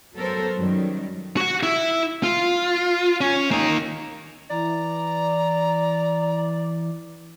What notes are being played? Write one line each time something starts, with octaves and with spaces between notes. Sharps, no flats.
F#3 B3 A4 A#4 C5
F#2 D#3 F#3 G3
F#4 F#5
E4
F4
C#4
A#3 D#4
E3 D5 A#5